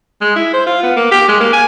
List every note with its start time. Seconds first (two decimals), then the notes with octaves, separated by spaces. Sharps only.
0.21 G#3
0.36 E4
0.53 C5
0.66 F4
0.83 B3
0.96 A#3
1.12 G4
1.28 G#3
1.40 A#3
1.53 G#5